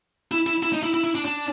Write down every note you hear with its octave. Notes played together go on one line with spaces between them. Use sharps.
E4
E4
E4
D#4
E4
E4
E4
D4
D4